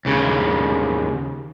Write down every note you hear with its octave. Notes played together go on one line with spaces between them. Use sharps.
D#2 C#3